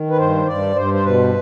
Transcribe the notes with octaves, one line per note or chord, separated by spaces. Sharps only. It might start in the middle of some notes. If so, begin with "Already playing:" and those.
Already playing: D#3
B4
G2 C5
G2 D5
G2 C5
C5
B2 B4